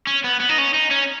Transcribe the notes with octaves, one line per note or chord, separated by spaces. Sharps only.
C#4
B3
B3
D#4
C#4
D#4
C#4